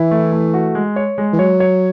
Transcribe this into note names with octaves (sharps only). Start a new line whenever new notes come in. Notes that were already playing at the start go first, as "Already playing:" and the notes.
Already playing: E3 E4
A3
A3
F#4
G#3
C#5
G#3
E3
F#3 C#5
C#5